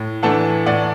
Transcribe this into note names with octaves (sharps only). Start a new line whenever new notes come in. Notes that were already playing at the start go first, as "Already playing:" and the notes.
Already playing: A2
E3 A3 D4 F#5 A5
A2 D5 F#5